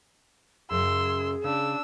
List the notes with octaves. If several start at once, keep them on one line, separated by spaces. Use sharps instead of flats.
F#2 C#3 F#3 G#4 C6 E6
C#3 D4 E6